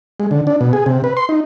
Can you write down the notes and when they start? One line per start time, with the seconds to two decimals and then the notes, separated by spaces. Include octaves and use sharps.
0.20 G#3
0.31 D3
0.47 D4
0.61 B2
0.73 G#4
0.86 C3
1.04 B4
1.17 C6
1.29 D#4